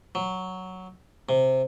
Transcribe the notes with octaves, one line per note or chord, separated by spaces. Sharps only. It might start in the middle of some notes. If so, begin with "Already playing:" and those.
F#3
C3